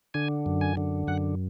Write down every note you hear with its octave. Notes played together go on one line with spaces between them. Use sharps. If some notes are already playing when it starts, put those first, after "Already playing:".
D3 G#5
F#2
G#5
D3
F#2 F#5